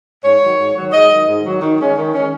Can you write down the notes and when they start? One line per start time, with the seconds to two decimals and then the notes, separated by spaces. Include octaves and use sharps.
0.23 G#2 C#5
0.41 D#3 F#3
0.57 G#2
0.74 F#3
0.80 D#3
0.92 G#2 D#5
1.10 D#3 F#3
1.27 G#2
1.45 D#3 F#3
1.61 D#3
1.79 G#3 C#4
1.96 D#3
2.13 G#3 C#4